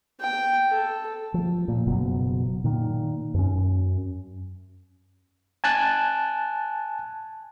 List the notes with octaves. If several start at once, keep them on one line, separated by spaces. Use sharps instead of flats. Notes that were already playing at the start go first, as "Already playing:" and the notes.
G5
A4
F3
A#2
F#1 B2 F#3
A#2 D#3
F#2 C#4
G#5 A5 F#6